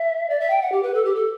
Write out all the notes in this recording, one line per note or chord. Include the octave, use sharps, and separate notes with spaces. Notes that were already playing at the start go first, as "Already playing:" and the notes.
Already playing: E5
D5
E5
G5
F#5
G4
B4
A4
G4
A4